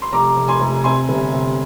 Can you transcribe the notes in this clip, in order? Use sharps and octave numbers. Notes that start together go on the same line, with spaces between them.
C6
F1 A#5 D6
F1
G#5 C6
F1
C3 G#5 C6
G1
C3